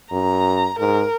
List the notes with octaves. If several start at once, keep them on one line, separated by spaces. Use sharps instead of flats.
F#2 A#5
G#2 A#4